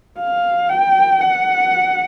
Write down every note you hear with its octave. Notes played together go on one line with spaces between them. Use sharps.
F5
G5
F#5